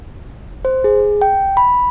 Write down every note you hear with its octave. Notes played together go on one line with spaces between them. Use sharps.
C5
G#4
G5
B5